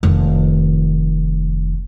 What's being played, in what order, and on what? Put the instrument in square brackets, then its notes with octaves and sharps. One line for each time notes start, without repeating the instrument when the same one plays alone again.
[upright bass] F1 D#3